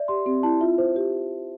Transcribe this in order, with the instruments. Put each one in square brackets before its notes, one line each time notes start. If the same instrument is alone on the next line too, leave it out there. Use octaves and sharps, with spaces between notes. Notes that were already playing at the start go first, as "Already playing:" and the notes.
Already playing: [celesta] D5 E5
[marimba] G4 [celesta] C6
[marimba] C4 [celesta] G4
[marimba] E4 [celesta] A5
[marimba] F4 [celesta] E5
[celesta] C5
[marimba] G4 [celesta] C5